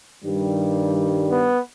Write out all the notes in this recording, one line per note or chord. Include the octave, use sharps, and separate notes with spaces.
G2 D#3 G3
B3